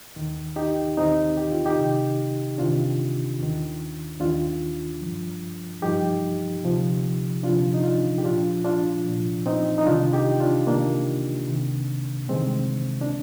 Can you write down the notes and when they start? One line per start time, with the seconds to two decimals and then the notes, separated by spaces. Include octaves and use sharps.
0.16 D#2 D#3
0.56 D#4 G4
0.97 D#2 D#3 C4 D#4
1.37 G4
1.52 F4
1.65 D#4 G4
1.78 C2 C3 D#3
2.58 C2 C3 D#3 D4 F4
3.39 D#2 D#3
4.20 D#2 D#3 D4 F4
5.01 G2 F3
5.82 G2 F3 D#4 G4
6.63 D2 C3 F3
7.43 D2 C3 F3 D4 F4
7.74 D#4
7.84 D4 F4
8.18 G4
8.24 C2 A#2 F3 D4 F4
8.65 D4 F4
9.05 C2 A#2 F3
9.46 C4 D#4
9.78 D#4
9.86 C2 C3 D#3 D4 F4
10.13 D#4 G4
10.40 D4 F4
10.67 C2 C3 D#3 A#3 D4
11.48 C2 C3 D#3
12.28 C2 C3 D#3 G#3 C4
13.01 D4